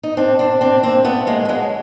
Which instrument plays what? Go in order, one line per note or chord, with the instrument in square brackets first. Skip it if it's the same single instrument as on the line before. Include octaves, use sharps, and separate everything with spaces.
[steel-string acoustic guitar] D#4
C4 D4
C4 D4
C4 D4
A#3 C4
A3 B3
G#3 A#3
A3
F#3 G#3